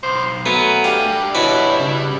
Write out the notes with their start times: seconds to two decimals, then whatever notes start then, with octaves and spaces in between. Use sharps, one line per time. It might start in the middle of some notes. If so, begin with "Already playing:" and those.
0.03 B1 C5
0.46 F#3 A3 B3 A#4 G#5 D#6
0.84 G3 D4 G4 F5
1.35 B2 B3 E4 F#4 C#5 B5
1.79 C#3